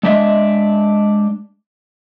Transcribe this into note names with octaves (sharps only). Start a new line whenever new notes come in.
G#3 D4 D#5 E5